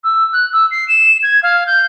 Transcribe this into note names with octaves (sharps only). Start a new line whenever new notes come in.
E6
F#6
E6
C7
E7
G#6
F5
G6